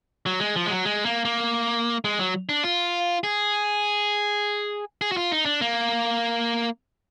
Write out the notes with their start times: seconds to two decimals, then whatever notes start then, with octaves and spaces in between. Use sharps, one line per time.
0.26 F#3
0.40 G#3
0.56 F3
0.66 G#3
0.70 F#3
0.85 G#3
1.05 A#3
1.25 A#3
2.05 G#3
2.19 F#3
2.49 D4
2.63 F4
3.24 G#4
5.02 G#4
5.12 F#4
5.17 F4
5.32 D#4
5.46 D4
5.61 A#3